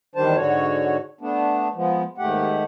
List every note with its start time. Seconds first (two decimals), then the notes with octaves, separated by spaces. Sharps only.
0.16 E2 D#3 G3 D4 C5 A5
0.36 G#2 D3 F#4 C#5
1.21 A3 B3 D4
1.75 F3 G#3 B3
2.18 D#2 G#2 A3 G4 F#5